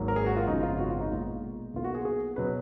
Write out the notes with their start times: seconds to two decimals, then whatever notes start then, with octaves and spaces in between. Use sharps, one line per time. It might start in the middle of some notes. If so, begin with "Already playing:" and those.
Already playing: G#1 G#2 F#3 A#3
0.08 A#4
0.16 G#4
0.26 F#4
0.37 F4
0.47 G#1 F#2 C#3 F3 B3 D#4
0.63 F4
0.79 F#4
0.90 F4
1.01 D#4
1.10 B1 A#2 G#3 B3 F4
1.74 B1 B2 A#3 F4
1.84 F#4
1.95 G#4
2.05 G#4
2.36 B2 F#3 B3 B4